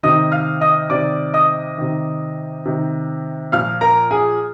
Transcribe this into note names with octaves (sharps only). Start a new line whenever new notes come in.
C3 D#3 D#5 D#6
F5 F6
D#5 D#6
C3 D#3 D5 D6
D#5 D#6
C3 D#3
C3 D#3
A#2 F3 F5 F6
A#4 A#5
G#4 G#5